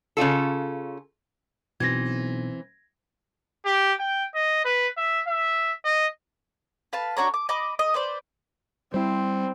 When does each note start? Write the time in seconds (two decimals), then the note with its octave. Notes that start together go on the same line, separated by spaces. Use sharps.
0.17 C#3 C#4 F4 A4
1.80 B1 B2 E3 C4 G#6 A#6
3.66 G4
4.00 G5
4.35 D#5
4.65 B4
4.98 E5
5.28 E5
5.85 D#5
6.93 B4 F5 A5
7.17 D4 F#4 C#5 A#5
7.34 D6
7.49 D#5 B5 D6
7.79 D#5
7.94 B4 C5 D5
8.94 G3 C4 E4 C5